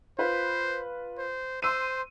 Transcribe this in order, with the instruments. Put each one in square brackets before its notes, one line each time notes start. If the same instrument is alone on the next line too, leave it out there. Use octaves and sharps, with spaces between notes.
[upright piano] F4 B4 [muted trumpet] C5
[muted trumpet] C5
[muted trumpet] C5 [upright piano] C6 E6 D#7